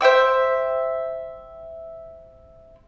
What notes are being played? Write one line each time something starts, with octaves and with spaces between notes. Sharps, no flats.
C5 E5 G5 E6